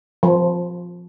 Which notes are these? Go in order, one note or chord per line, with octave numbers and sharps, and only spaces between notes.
F3